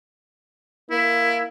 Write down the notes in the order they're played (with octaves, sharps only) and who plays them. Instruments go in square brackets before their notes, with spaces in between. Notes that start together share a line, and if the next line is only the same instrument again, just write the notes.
[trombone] A#3 [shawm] E4